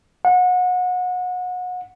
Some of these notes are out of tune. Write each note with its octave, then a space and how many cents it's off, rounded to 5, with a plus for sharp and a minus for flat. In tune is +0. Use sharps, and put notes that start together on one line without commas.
F#5 -30